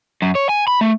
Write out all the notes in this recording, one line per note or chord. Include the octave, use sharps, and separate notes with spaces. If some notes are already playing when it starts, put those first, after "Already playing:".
F#2
C#5
G#5
B5
A3